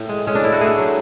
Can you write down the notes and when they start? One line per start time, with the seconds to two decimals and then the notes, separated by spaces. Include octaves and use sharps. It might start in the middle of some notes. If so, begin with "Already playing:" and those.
Already playing: A2
0.09 G#3
0.27 G#3 C#4
0.35 D4
0.43 A2 E4
0.52 F#4
0.61 A3 G#4
0.78 F#3